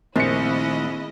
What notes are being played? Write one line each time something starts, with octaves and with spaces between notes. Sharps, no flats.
A#1 D#3 A3 C4 E4 D#5 C#7